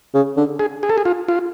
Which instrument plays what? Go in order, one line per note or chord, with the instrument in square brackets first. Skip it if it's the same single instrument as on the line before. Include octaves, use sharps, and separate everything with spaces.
[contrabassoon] C#3
D3
[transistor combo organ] G#4
G#4
A4
G#4
F4
F4